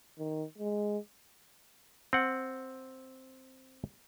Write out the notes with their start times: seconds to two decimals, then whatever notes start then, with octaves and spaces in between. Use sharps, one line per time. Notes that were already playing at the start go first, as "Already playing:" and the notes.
0.19 D#3
0.58 G#3
2.13 C4 F#5